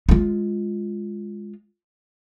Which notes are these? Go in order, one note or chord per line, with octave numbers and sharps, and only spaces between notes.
G#3 F4